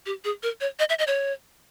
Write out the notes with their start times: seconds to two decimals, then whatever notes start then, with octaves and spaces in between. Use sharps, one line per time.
0.06 G4
0.24 G#4
0.43 A#4
0.61 C#5
0.79 D#5
0.89 E5
0.99 D#5
1.07 C#5